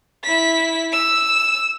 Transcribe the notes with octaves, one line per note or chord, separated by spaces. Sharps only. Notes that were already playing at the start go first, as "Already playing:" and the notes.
E4 B6
E6